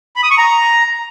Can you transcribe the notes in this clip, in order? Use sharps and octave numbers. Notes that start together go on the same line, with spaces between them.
B5
D#6
C#6
A#5